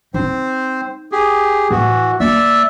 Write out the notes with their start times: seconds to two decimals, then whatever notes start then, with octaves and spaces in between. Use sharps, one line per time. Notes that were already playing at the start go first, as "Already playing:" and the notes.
0.14 C4 D#4 C5
1.12 G4 G#4
1.70 A2 E3 F#4
2.20 A#3 D5 E5 E6